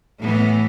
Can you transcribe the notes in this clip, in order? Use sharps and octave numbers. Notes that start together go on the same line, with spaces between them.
A2 E3 B3